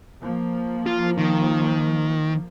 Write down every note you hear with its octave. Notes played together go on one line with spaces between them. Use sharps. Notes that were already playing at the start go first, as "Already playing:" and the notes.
F3 A#3
F4
D#3